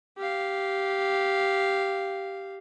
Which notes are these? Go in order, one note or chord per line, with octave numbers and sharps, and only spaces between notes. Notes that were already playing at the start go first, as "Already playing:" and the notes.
G4 F5